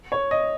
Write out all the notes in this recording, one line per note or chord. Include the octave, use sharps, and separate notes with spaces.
C#5
D#5